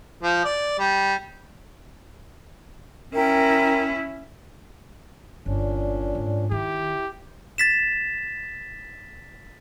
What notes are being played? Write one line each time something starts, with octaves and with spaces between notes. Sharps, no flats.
F3
D5
G3
C#4 E4 A#4 G5
G1 A#2 C#4 D4
G#2
D#3 E4 G4
A6 B6 E7